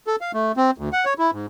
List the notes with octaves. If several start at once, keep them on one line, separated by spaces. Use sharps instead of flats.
A4
F5
A3
C4
D2
F#5
C#5
E4
G#2